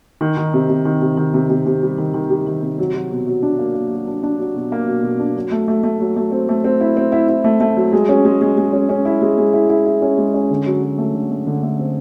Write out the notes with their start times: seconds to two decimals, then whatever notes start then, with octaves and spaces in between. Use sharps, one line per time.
0.21 D#3
0.37 D#3
0.54 C3
0.69 C3
0.85 D#3
1.02 C3
1.17 D#3
1.34 C3
1.50 C3
1.66 C3
1.83 G3
1.98 D#3
2.14 D#3
2.30 G3
2.47 D#3
2.62 C3
2.79 F#3
2.95 F#3
3.11 B2
3.27 F#3
3.42 D4
3.59 A#3
3.74 A#3
3.91 F#3
4.07 D4
4.23 D4
4.40 F#3
4.55 B2
4.72 A#3
4.88 B2
5.03 B2
5.19 D4
5.36 F#3
5.52 A3
5.68 A3
5.84 A3
6.00 F#3
6.16 A3
6.32 C4
6.49 A3
6.64 C4
6.81 E4
6.97 C4
7.12 E4
7.29 E4
7.44 A3
7.60 A3
7.77 F#3
7.93 G#3
8.09 C#4
8.25 G#3
8.41 G#3
8.58 G#3
8.73 C#4
8.89 C#4
9.05 E4
9.22 G#3
9.38 G#3
9.54 E4
9.69 E4
9.86 E4
10.02 C#4
10.18 G#3
10.34 C#4
10.51 D3
10.66 F#3
10.82 F#3
10.98 A3
11.14 D3
11.31 A3
11.47 D3
11.63 A3
11.79 C4